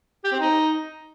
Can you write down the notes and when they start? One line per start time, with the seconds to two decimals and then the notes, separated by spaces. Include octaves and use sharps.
0.24 G4
0.32 C4
0.40 D#4